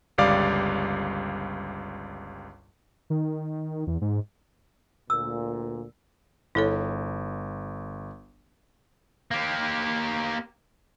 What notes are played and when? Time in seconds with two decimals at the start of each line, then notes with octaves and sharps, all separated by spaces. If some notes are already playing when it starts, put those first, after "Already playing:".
0.18 G1 C#2 G3 D5 F5 D6
3.10 D#3
3.87 E2
4.01 G#2
5.10 D2 A#2 E6
6.55 G1 E4 A4 C#5
9.31 A#3 G4